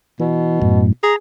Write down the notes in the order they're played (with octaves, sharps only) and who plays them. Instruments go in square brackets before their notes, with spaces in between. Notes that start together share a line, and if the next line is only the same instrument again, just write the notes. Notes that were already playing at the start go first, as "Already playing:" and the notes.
[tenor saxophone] B2 [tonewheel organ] E3
[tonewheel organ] F#2 A2
[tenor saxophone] G#4 [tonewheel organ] A#5